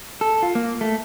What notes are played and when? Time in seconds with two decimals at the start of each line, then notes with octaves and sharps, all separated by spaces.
0.21 A4
0.43 F4
0.55 A#3
0.81 A3